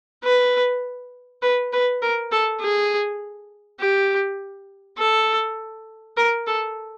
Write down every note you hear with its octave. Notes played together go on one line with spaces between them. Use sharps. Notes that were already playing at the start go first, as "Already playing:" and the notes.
B4
B4
B4
A#4
A4
G#4
G4
A4
A#4
A4